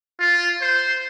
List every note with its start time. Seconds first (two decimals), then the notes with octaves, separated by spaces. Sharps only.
0.20 F4
0.62 C5